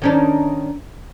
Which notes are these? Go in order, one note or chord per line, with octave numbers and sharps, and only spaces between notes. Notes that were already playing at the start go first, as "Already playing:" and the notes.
D#3 C#4 D4